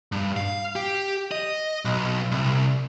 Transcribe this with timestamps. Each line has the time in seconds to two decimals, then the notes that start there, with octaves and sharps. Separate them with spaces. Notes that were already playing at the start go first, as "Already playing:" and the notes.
0.12 G2
0.37 F5
0.76 G4
1.31 D#5
1.85 B1
2.32 C2